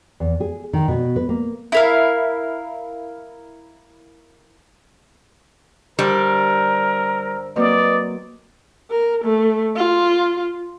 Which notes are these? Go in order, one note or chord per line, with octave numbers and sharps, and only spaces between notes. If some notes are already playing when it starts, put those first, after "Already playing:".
E2
G#4
D#3
B2
B4
A#3
E4 A#4 F5
G2 D3 G3 A#4 C5 E6 G6
F#3 A#3 C4 B4 D5 D#5 D#6
A#4
A3
F4